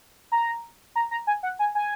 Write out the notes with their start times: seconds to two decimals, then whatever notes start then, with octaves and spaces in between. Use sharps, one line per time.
0.32 A#5
0.96 A#5
1.11 A#5
1.27 G#5
1.43 F#5
1.59 G#5
1.75 G#5